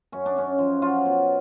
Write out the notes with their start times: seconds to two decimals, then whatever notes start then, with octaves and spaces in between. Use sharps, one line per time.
0.12 F#2 C#4
0.26 D4
0.36 F#2 C#4
0.58 F3
0.82 F#3 F4
1.05 B2